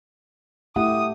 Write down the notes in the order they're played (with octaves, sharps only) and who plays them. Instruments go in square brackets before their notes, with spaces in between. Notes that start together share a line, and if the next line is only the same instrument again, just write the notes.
[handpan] A3 G4 [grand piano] E4 F#5 [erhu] D#6